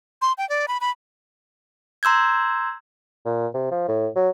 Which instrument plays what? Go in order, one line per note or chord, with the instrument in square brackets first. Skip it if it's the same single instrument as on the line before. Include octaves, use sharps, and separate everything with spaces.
[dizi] C6
G5
D5
B5
B5
[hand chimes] A#5 C6 E6 G6 G#6
[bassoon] A#2
C3
F3
A2
F#3